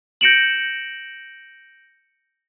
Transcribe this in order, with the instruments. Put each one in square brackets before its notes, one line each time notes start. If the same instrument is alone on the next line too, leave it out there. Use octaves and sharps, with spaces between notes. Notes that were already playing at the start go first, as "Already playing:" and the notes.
[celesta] G6 A#6 C#7 D7 E7 F#7